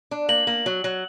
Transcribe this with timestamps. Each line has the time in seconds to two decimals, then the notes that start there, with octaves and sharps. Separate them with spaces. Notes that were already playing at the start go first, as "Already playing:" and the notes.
0.11 D4
0.29 A#3 F#7
0.47 A#3
0.66 F#3
0.84 F#3